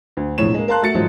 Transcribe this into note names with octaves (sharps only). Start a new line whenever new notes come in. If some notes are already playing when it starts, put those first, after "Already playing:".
D2
E1 F2 A2 C#5 E7
G#3 A#3
A#4 F5 A5 C6 F#6
A3 F#4 A6 C#7
G#2 D#3 F3 F#3 D#4